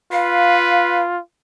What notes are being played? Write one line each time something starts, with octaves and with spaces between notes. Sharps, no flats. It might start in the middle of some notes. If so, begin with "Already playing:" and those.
F4 B4 F5